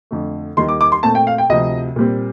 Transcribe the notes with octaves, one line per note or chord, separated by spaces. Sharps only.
F2 D3 A3
D#2 D#3 G3 C6
D6
D6
C6
A#2 A3 C4 A5
G5
F5
G5
D2 C3 F3 C4 D#5
A#2 G3 C4